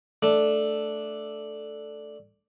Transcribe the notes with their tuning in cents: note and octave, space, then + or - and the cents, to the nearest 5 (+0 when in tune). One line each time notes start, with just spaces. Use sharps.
A3 +0 D4 +0